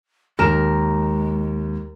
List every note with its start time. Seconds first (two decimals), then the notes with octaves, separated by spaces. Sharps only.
0.39 D#2 G#3 A#4 E7